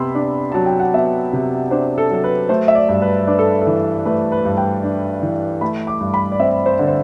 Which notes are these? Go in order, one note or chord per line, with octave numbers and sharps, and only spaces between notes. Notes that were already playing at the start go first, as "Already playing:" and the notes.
Already playing: C3 B3 B5 C6 E6
D4
F#3 A5
G5
F#5
B3 E5
C3
D4 C5
A4
F#3 A4
B4
A3 C5
E5
D5
G2
B4
D4 B4
A4
A4
E3
A3 B4
B4
G2
G5
D4
E3
A3 B5
D6
G2
B5
D5
C4 E5
C5
D3
C5